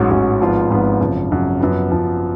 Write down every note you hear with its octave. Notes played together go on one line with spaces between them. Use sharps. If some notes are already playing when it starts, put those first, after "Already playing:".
Already playing: A1 G#2 F#3 C#4
A1 G#2 F#3 C#4
G#1 G#2 F3 B3 F4
G#1 G#2 F3 B3 F4
F#2 C#3 F3
F#2 C#3 F3
F#2 F3 B3
F#2 F3 B3